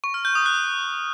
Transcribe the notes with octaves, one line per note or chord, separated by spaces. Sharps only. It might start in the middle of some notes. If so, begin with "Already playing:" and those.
C#6
F6
G6
D#6
F#6